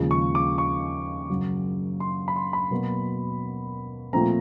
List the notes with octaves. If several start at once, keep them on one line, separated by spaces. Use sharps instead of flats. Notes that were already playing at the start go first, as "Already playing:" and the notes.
Already playing: D#2 C#3 F3 G#3
C#6
D6
C#6
F#2 C#3 F#3
C6
B5
C6
B5
B2 F#3 A#3
A#2 F3 A3 C4 A#5